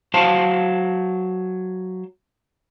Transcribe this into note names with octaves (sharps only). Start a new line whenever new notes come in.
F#3 C5 F5 A5